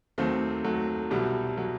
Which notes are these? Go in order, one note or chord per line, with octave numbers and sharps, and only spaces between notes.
D#2 D#3 F#3 A3 C4
F#3 A3
C2 B2 F#3 G3
F#3